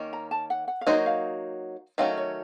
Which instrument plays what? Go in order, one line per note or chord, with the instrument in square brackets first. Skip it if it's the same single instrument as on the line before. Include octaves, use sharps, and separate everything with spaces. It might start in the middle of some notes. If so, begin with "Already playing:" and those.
Already playing: [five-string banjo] D#3 A#3 C#4
[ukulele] A#5
A5
F#5
F#5
F5
[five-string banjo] F#3 A#3 D#4 F#4 C5
[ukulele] D#5
F5
[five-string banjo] D#3 F#3 A3 C#4 [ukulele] F5
[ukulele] C#5